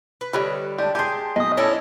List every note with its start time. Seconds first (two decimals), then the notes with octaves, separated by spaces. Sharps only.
0.21 B4
0.33 D3 G3 B4 C#5 D#5
0.78 G#3 D4 G4 D5 A5
0.95 G4 G#4 G#5 A5 C6 G6
1.36 B1 D#5 D#6
1.57 C#4 D4 E4 G#4 A4 C#5 D#5